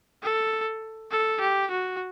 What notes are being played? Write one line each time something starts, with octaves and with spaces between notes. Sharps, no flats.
A4
A4
G4
F#4